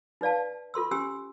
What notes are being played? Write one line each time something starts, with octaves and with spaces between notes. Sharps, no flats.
D#4 B4 D5 F5 A5
F4 A4 C6 E6
C#4 G4 G#5 C6 E6